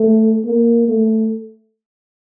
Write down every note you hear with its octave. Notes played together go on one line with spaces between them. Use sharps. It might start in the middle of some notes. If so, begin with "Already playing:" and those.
Already playing: A3
A#3
A3